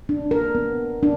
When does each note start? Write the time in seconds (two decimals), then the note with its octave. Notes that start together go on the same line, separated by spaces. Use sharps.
0.09 D4
0.31 A#4
0.55 B3
1.03 D4